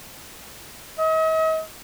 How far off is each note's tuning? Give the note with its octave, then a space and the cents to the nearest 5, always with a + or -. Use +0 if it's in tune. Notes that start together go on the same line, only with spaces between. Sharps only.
D#5 +45